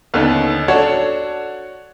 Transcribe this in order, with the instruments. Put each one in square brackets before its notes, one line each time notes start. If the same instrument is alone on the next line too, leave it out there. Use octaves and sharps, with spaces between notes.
[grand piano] D#2 D3 [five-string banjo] B3 C#4 D#4
[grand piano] D4 F#4 C#5 [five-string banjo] A4